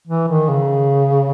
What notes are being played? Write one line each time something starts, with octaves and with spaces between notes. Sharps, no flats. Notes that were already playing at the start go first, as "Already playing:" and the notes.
E3
D#3
C#3